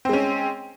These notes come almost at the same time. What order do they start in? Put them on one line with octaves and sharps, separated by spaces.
C4 G#3 C#4